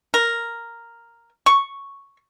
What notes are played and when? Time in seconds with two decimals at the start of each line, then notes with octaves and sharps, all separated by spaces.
0.14 A#4
1.46 C#6